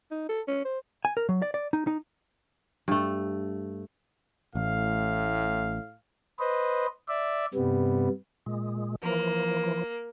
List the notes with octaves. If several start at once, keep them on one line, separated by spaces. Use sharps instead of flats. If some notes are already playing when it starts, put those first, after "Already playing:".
D#4
A4
C#4
C5
G#5
A#4
F#3
D5
D5
D#4
D#4
G2 A3
A1 A2 F5
B4 C5 D#5
D5 E5
G2 C3 G3 B3
A#2 G#3
E3 F3 A#3